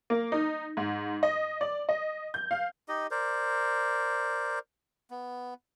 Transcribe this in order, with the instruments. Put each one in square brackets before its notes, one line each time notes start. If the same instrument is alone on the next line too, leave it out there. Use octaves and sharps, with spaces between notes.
[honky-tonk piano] A#3
D#4
G#2
D#5
D5
D#5
G6
F5
[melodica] D#4 G4 D#5
A#4 C5 D5
B3